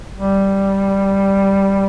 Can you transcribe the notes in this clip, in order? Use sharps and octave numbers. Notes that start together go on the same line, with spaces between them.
G3